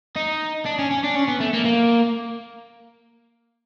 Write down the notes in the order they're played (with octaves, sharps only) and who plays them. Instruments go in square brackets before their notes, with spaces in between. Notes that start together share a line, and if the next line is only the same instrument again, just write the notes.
[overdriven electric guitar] D#4
D4
C#4
C#4
D4
C#4
B3
A3
A#3
A#3